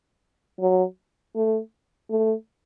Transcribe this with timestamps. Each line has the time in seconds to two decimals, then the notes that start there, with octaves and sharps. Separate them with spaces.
0.60 F#3
1.35 A3
2.10 A3